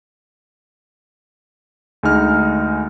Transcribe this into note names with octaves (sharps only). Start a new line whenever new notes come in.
D2 G#3 D#4 F6